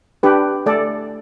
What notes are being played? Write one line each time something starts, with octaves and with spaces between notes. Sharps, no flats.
D4 G4 B4
A3 A4 D5